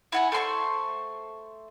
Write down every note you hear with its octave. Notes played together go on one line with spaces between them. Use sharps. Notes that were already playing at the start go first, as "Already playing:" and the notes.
E4 F#5 G#5
A3 C5 C6 C#6